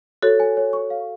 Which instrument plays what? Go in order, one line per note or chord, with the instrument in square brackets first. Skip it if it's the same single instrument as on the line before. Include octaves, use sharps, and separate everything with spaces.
[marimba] F#4 A4 [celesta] C#5
[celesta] G#5
C#5
C#6
F5